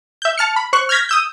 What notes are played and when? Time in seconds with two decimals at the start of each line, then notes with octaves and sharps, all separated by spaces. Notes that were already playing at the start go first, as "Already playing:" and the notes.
0.22 E5 G6
0.37 A5 F6 C#7
0.56 B5
0.73 C5 C#6 F#6
0.89 F6 G6 G#6 A#6 B6
1.09 D#6 E6 G6